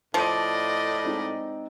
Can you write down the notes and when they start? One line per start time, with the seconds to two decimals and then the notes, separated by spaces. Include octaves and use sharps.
0.14 A2 F3 D5 D#5 C6 G6 D#7
1.05 G#3 C4 D#4